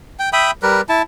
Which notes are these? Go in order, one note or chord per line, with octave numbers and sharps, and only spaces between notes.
G5
E5 G5 B5 D#6
G3 A#4 B4
E4 A5